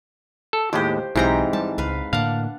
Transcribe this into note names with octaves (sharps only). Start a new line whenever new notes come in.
A4
D#2 A2 G#3 G4 C5
B1 G#2 E3 C4 D#4 G4 A#5
G3 A5
C#2 B4 F5
A2 D3 A#3 D4 F5 F#5